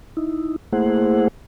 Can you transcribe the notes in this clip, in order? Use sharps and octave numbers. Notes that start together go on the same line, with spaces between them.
D#4 E4
A3 A#3 E4 G#4 C5 F#5